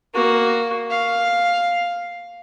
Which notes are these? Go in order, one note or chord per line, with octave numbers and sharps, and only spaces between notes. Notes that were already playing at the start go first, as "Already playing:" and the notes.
A#3 F#4
F5